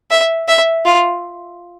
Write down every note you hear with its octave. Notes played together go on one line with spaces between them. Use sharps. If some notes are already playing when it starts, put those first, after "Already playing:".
E5
E5
F4